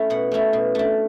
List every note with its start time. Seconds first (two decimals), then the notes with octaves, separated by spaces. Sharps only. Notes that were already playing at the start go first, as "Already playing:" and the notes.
Already playing: A3 C#4 E4
0.10 B2 F#5
0.32 A3 C#4 E4
0.53 B2
0.75 A3 D4